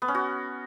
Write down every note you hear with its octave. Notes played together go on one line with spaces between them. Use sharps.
B3
C#4
F#4